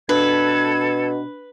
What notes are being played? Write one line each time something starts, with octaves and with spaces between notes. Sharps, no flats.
B2 D4 A4 B4 G#6